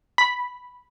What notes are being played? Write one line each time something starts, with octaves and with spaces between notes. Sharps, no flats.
B5 B6